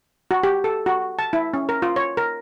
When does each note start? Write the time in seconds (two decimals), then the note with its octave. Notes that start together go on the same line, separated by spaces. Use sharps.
0.31 F#4
0.43 G4
0.64 A4
0.86 F#4
1.19 A5
1.33 E4
1.54 C#4
1.69 A#4
1.82 F4
1.96 C#5
2.17 A#4